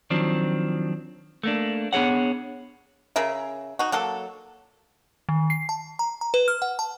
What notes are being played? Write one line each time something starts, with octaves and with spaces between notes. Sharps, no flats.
D#3 F3 F#3 C4 D4
A3 A#3 D4
B3 D4 G#4 C#5 F#5
C#3 G#4 A#4 E5
D#4 F#4
F#3 A#3 A4
D#3
C7
A5
A#5
A#5
B4
F6
F#5
A5